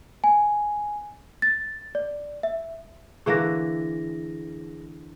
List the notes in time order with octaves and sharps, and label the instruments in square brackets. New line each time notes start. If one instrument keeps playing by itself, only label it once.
[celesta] G#5
A6
D5
E5
[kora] D3 E3 A#3 [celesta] G#4 A#6